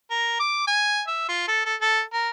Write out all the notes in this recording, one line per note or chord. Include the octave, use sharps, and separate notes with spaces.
A#4
D6
G#5
E5
F4
A4
A4
A4
A#4